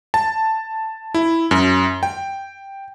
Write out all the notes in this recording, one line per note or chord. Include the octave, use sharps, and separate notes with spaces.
A5
E4
F#2
G5